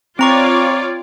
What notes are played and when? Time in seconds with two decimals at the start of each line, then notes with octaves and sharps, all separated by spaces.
0.19 C4 F4 C#5 D5 A#5 C#6